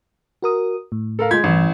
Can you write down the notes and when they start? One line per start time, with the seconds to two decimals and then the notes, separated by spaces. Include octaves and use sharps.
0.42 F#4 A#4 D#6
0.92 A2
1.19 A4 A#4 F5
1.31 G#3 F4 G6 G#6 B6
1.44 A1 G2 E3